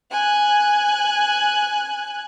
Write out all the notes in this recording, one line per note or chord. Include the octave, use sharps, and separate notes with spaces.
G#5 F#6